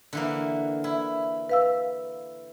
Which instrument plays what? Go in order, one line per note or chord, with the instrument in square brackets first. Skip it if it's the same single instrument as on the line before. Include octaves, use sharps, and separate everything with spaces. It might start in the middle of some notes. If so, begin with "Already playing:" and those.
[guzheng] D3 E3 A#3
E4
[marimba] B4 F5 E6